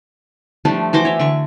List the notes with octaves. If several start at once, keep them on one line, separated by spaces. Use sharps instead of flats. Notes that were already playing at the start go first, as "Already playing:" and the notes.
F3 G3 A3 D4
E3 F#4 C5 D6
C#5 E5
D3 C#6